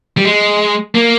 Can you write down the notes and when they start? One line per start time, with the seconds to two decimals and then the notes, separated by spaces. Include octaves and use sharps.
0.17 G3
0.25 G#3
0.95 A#3